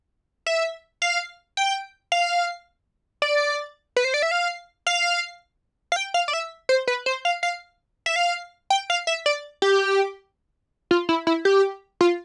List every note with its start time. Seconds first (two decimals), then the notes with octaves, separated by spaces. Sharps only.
0.46 E5
1.02 F5
1.57 G5
2.12 F5
3.22 D5
3.96 B4
4.04 C5
4.14 D5
4.22 E5
4.31 F5
4.87 F5
5.92 F5
5.96 G5
6.14 F5
6.28 D5
6.33 E5
6.69 C5
6.87 B4
7.06 C5
7.25 F5
7.43 F5
8.06 E5
8.16 F5
8.70 G5
8.90 F5
9.07 E5
9.26 D5
9.62 G4
10.91 F4
11.09 E4
11.27 E4
11.45 G4
12.01 F4